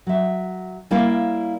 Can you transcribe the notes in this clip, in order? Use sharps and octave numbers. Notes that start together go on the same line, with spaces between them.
F#3 E5
G3 A#3 E4 C#5 D5 F5